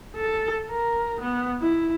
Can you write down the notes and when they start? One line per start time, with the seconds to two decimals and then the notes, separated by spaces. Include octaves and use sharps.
0.15 A4
0.70 A#4
1.20 B3
1.61 E4